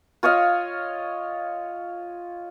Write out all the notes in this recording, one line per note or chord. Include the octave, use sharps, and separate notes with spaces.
F4 C#5 D#5 F5